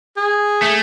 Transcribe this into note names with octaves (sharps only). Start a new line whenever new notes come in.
G#4
A3